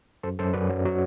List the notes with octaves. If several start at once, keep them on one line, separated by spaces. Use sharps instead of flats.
F#2 A4 C5
F#2 A4 C5
F#2 B4 D5
F#3
F#3